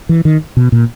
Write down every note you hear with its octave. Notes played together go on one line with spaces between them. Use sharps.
E3
D#3
B2
A#2